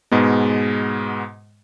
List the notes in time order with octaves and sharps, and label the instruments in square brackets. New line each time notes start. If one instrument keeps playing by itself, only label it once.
[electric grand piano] G#2 B2 G#3 B3